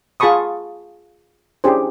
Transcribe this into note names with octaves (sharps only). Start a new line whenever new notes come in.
F4 G#4 A5 B5 C#6 D#6
C#4 D4 E4 G4 G#4 C5